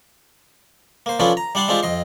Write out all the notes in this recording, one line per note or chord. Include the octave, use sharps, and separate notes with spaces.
A#3 C5
F3 C#4 D4 F4 A4 B4
A#5
G3 D4 F#5 A5 C6
G#3 C4 D4 F4 G4
F2 D#5 C6